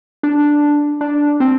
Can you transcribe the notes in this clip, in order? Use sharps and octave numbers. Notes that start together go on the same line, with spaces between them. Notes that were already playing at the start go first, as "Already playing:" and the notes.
D4
D4
C4